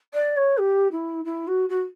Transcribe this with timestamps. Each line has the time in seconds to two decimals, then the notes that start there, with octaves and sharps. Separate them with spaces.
0.14 D5
0.37 C#5
0.58 G4
0.92 E4
1.25 E4
1.48 F#4
1.69 F#4